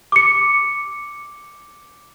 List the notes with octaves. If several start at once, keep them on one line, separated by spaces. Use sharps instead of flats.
D6 C#7